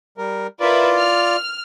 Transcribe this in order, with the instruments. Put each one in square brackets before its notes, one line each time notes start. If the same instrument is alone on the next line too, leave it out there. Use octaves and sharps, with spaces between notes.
[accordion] G3 A#4
[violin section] E4 A#4 B4 [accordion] F4 D5
[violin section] F6